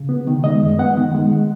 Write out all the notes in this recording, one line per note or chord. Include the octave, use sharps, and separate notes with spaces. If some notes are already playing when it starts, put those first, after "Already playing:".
Already playing: C#3
B3
D#3
G#3 D#5
F#2
B3 F#5
D#3
G#3